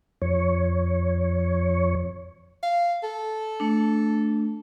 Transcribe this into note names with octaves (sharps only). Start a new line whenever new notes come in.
F2 C#5
F5
A4
A3 D4